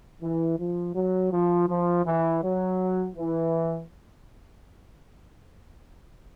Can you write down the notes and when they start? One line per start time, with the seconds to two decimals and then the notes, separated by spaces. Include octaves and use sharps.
0.21 E3
0.58 F3
0.95 F#3
1.31 F3
1.68 F3
2.05 E3
2.42 F#3
3.16 E3